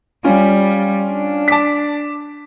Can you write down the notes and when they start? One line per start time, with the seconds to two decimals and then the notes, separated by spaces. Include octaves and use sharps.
0.24 G3 C#4 F4
1.10 D4
1.48 A5 D6 B6